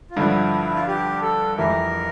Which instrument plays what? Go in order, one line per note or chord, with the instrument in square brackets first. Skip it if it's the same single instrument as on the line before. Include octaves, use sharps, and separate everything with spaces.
[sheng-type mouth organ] F4
[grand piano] G2 D3 F3 [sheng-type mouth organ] E4
[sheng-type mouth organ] F4
G4
A4
[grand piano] F2 E3 A3 E4 G4 [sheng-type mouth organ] A#4